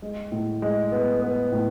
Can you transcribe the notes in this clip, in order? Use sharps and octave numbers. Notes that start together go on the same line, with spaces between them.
G#3
A2
G#3
B3
B3
A2